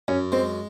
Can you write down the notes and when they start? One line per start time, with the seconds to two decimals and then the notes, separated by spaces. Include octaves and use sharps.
0.08 F#2 C#4
0.32 G#3 C4